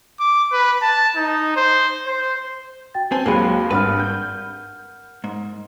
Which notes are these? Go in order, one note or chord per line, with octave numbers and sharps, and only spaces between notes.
D6
B4
A5
D#4
C5
C5
F#4 G5 A6
C4 B4 C5 G#5 A5
D#2 F#3 G#3 A#3 C4 G5 B5 D#7
G#1 G2 A#4 B4 F#5 F6
G6
G#2